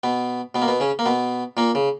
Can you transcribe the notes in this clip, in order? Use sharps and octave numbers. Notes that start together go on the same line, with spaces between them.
B2 B3
B2 B3
A#3
B2 B3
C#3 C#4
A#3
B2 B3
A#2 A#3
C#3